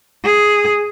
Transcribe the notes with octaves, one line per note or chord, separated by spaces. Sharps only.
G#4